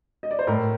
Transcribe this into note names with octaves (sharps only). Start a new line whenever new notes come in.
D#5
D5
C5
A2 A#4